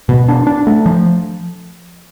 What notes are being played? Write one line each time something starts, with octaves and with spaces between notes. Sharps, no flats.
B2
D4
D4
A3
F3